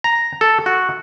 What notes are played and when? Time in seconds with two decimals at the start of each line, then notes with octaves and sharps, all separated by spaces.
0.04 A#5
0.41 A4
0.66 F#4